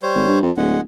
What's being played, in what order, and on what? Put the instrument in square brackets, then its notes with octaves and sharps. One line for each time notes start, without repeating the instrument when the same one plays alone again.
[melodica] G3 C5 C#5
[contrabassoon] G#1
G2
F2
[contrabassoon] D1 [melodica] G#3 F#5